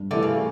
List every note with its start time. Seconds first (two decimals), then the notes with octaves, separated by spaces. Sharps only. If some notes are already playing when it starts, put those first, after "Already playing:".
Already playing: G2
0.11 D3 E3 A3
0.23 C#3